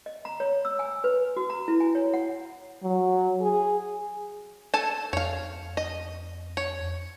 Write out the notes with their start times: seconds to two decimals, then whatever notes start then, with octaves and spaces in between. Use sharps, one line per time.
0.06 D#5
0.25 A#5
0.40 C#5
0.65 E6
0.79 G#5
1.04 B4
1.37 F#4
1.50 A#5
1.68 E4
1.80 G#5
1.95 C#5
2.14 F#5
2.83 F#3
3.41 G#4
4.74 A4 G#5 A5
5.13 F2 C#5 F5
5.77 D#5
6.57 C#5